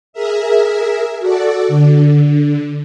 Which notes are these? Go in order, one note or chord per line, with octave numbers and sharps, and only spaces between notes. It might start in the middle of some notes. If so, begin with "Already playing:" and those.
G#4 A#4 E5
F#4 A4 D5
D3